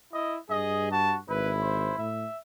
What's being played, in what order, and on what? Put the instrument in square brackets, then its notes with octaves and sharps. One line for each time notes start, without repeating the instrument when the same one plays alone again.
[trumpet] E4 [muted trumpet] D#5
[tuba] G2 [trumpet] G#4 [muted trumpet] D#5
[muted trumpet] F#4 [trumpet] A5
[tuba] G#1 [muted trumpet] E4 [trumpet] B4
[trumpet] C5
[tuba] A2 [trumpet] E5